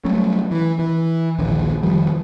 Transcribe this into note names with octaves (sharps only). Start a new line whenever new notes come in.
F#3 G3 A3 C#4
E3
E3
A#1 D#2 A#2 D3
F1 D#3 F3 G3